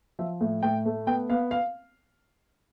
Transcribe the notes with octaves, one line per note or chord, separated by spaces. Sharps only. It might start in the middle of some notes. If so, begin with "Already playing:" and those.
F3 E5
A2
A2 G5
A3
B3 G5
B3 F5
F5